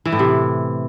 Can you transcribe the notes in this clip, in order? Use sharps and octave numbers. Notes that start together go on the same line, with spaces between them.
E3
A2
C3